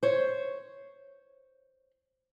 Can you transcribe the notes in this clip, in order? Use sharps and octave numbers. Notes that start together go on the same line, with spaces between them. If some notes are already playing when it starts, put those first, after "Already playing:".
C5 C#5